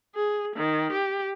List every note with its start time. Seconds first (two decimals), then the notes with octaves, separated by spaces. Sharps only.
0.15 G#4
0.56 D#3
0.92 G4